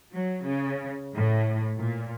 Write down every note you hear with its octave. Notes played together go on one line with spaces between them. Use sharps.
F#3
C#3
A2
A#2